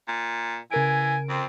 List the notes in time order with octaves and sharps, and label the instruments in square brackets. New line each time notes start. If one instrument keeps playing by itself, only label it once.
[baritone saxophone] A#2
[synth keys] C#3 A#4 D7 [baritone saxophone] E3 [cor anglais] G#5
[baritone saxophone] F2 [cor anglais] C4